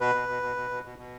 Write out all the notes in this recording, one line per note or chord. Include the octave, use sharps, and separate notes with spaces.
B2 B4
B2
B2
B2
B2
B2
B2
B2